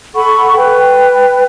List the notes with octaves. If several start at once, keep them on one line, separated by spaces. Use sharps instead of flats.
A4 F#5 B5 C#6
B4 G5